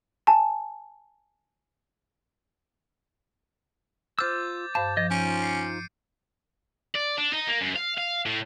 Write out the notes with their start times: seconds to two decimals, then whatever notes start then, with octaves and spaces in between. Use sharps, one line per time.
0.27 G#5 A5
4.19 F4 C5 D6 E6 F6 G6 A6
4.75 G2 C5 F5 A5
4.97 F3 D#5
5.11 C#4 D#4 F4 C5 D7 D#7
5.43 C7 C#7
6.95 D5
7.18 D4
7.33 D#4
7.48 A#3
7.61 F#2
7.76 F5
7.98 F5
8.26 A2